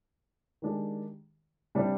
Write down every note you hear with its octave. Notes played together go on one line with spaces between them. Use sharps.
D#3 G#3 D4 G4
C3 G3 D4